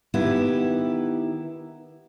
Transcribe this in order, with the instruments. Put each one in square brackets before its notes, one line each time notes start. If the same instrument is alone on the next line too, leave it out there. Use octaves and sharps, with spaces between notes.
[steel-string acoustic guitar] D#3 B3 E4 G4